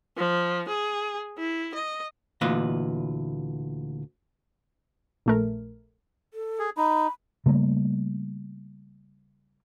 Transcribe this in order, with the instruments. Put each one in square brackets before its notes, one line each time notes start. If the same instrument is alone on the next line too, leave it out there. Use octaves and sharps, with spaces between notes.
[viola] F3
G#4
E4
D#5
[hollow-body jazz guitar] D2 A#2 E3 B4 D#5
[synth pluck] A#1 A3 A#4
[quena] A4
[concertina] G#4
[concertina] D#4 [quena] B5
[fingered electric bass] C#3 G3 A3 A#3